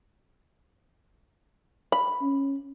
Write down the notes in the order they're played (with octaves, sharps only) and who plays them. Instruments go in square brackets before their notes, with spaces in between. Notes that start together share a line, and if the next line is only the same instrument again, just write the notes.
[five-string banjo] B5
[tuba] C#4